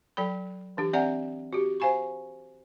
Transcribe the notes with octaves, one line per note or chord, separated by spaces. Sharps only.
F#3 A4 G5 B5
E3 D4 G4
C4 D5 E5 F#5 A#5
F#4 G4
C5 F5 G#5 B5 C#6